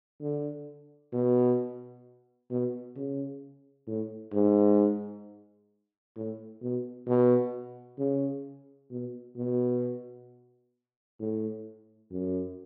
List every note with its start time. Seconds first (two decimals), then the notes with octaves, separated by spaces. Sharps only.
0.21 D3
1.13 B2
2.51 B2
2.96 C#3
3.87 A2
4.33 G#2
6.16 A2
6.62 B2
7.07 B2
7.99 C#3
8.91 B2
9.37 B2
11.20 A2
12.11 F#2